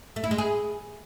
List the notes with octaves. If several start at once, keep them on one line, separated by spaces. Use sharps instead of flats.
A3
E4
G#3
G#4